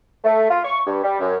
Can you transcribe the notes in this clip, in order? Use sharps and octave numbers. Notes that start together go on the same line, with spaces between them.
A3
F4
C#6
G2
G3
F#2